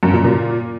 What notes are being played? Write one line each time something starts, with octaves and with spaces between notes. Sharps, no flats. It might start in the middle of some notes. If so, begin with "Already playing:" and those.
F#2
A#2
A#2